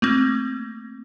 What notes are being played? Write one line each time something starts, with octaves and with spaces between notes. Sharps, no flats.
A3 A#3 C4